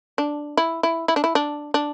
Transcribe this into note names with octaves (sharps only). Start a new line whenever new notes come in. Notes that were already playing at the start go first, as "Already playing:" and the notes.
D4
E4
E4
E4
D4
E4
D4
D4